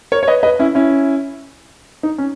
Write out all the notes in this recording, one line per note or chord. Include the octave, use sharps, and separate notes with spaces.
A#4 C#5
C#5
B4 D#5
B4 D#5
C#4 E4
C#4 E4
D#4
C#4